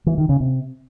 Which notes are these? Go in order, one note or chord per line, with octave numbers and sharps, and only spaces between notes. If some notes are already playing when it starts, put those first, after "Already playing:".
E3
D#3
C#3
C3